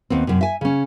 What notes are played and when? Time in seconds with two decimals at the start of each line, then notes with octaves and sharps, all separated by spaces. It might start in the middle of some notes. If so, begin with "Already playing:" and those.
0.10 D#2 B3 C4
0.27 F#2 C3
0.41 E5 G#5
0.61 C#3 C#4